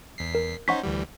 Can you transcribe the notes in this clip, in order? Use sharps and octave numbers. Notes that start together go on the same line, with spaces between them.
E2 B6 C7
A#4
C#4 D#4 C5 F#5 C#6 B6
D2 E3 G3